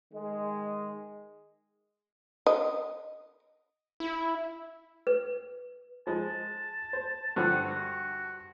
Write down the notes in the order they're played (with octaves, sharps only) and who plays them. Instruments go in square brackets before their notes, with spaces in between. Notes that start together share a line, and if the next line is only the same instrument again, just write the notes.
[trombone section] D#3 G#3
[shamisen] D#5
[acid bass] E4
[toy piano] B4
[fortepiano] F3 G#3 [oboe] A5
[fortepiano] C5
[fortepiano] G2 D3 F3 [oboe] F#5
[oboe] F#4